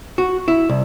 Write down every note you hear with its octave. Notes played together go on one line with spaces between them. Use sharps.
F#4
E4
C2